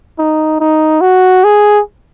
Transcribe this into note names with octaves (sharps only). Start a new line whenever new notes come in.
D#4
D#4
F#4
G#4